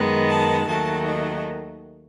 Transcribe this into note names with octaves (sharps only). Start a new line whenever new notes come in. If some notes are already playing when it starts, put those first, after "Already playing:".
Already playing: F#2 D#3 G#3 B3
A5
D#2 D#3 F#3 A3 A5
D#5